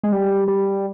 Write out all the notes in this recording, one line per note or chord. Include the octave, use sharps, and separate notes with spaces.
G#3
G3
G3